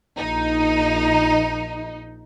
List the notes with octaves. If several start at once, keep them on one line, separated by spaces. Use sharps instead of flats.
A#1 D#4